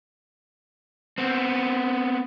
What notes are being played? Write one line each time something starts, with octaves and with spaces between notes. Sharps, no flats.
B3 C4